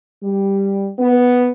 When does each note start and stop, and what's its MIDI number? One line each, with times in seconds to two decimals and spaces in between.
0.22 0.88 55
0.99 1.50 59